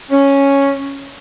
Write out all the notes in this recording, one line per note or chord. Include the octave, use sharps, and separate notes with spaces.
C#4